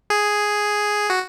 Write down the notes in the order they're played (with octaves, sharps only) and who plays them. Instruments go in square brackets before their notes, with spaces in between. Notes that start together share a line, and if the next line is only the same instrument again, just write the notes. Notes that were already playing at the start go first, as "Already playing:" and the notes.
[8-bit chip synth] G#4
F#4